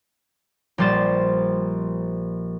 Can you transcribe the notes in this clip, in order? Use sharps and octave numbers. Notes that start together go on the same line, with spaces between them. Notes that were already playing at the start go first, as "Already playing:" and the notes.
A#1 F3 G3 C5 A6 E7